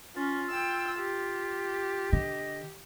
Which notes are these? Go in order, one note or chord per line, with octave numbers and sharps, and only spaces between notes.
C#4 F4
G5 E6
G4
D3 D#5